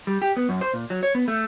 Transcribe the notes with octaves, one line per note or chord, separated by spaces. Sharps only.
G3
G4
B3
F#2
C5
A#2
F#3
C#5
B3
A3